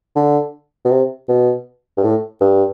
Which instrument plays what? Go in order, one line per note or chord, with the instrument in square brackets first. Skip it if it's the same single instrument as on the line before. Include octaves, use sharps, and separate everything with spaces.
[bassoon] D3
B2
C3
B2
G2
A2
G2